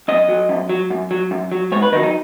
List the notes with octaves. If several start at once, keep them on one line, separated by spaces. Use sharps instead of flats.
F#2 D#5
F#3
F#2
F#3
F#2
F#3
F#2
F#3
G#2 C#5
B4
D#3 F#3 D#4
D#4